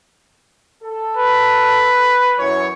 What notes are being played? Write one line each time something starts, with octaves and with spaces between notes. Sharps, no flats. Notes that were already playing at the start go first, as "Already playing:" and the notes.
A4
B4
F#2 E3 C#5